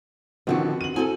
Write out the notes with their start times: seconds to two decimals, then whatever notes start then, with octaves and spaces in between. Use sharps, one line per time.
0.47 D3 D#3 F3 B3 C4 F#4
0.81 D#7 F#7
0.96 C4 E4 F#4 A4 C5 G#5